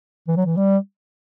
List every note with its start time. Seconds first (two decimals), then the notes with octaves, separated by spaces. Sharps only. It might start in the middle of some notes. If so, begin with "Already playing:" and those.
0.28 E3
0.37 F#3
0.46 E3
0.57 G3